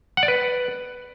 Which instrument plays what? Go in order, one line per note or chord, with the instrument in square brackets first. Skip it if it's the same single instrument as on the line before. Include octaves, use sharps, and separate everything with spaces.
[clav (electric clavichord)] F#5
D5
B4